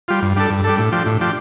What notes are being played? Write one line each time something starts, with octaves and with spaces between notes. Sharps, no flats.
G3 F4
G2
G3 D4 A4
G2
G3 D4 A4
A2
F3 D4 G4
A2
F3 D4 G4